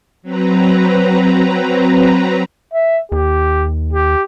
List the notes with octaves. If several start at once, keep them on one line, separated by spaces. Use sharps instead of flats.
F#3 C4 B4 A#5
E5
D#2 G4
G4